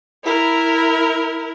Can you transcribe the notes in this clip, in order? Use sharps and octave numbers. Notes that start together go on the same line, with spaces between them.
E4 A#4